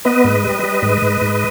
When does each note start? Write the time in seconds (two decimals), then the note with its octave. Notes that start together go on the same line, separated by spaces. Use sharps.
0.05 B3 B4 D#5
0.24 G#2
0.44 G3
0.63 G3
0.82 G#2
1.02 G#2
1.21 G#2